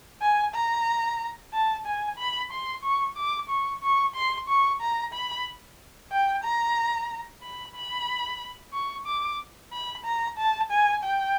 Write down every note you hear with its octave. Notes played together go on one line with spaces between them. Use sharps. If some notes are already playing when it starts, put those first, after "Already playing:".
G#5
A#5
A5
G#5
B5
C6
C#6
D6
C#6
C#6
C6
C#6
A#5
B5
G5
A#5
B5
B5
C#6
D6
B5
A#5
A5
G#5
G5